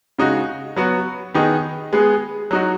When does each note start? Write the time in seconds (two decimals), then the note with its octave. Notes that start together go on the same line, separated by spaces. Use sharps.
0.19 C#3 G#3 D#4 F#4
0.76 F#3 B3 F#4
1.34 D#3 B3 D#4 G#4
1.93 G#3 B3 G#4
2.51 F#3 D#4 F#4